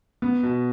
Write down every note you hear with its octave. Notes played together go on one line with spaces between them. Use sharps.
B3
B2